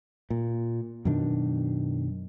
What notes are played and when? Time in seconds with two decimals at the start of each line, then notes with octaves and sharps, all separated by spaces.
0.30 A#2
1.05 F#2 B2 D#3 D4